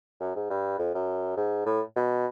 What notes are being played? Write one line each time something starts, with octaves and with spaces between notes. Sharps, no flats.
F#2
G#2
G2
F2
F#2
G#2
A2
B2